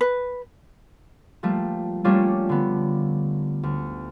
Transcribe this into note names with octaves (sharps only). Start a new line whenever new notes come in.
B4
F3 G3 A3 A#3
G3 A3 A#3 C#4 D4 F4
D3 B3
D2